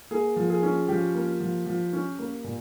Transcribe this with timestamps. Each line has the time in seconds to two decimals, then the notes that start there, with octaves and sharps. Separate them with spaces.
0.11 A#3 G#4
0.36 F3
0.50 G#4
0.63 C#4
0.88 F3 G4
1.14 A#3
1.40 F3
1.66 F3
1.93 C#4
2.19 A#3
2.44 A#2